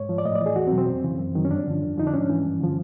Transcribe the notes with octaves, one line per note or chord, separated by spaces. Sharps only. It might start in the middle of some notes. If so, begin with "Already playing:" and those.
Already playing: G#2 C#5
F3
D5
A2 D#5
D5
E3
G#4
E2 F#4
C4
B2 F#3
C4
F2
C#3 E3
F#2
D#3 F#3
C#4
G2 D4
D3 F3
F2
D3 F3 D#4
D4
G#2 C#4
E3
G2
D3 F3